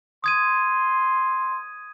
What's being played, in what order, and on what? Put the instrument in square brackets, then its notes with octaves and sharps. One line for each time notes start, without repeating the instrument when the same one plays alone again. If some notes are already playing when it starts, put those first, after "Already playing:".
[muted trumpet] C6 [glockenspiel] D#6 G#6 D#7